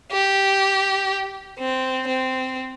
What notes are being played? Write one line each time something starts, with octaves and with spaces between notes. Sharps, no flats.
G4
C4
C4